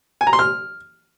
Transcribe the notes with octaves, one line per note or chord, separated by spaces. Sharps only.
G#5
A#5
C6
F6